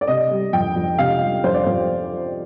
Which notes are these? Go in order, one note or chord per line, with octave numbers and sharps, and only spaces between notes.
D5
C3 D#5
G3
F2 G5
F2
C3 F5
G3
F2 C5
D5
F2 C5